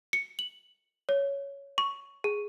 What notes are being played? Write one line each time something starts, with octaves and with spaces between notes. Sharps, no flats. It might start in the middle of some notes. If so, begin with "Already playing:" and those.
C#7
F#7
C#5
C#6
G#4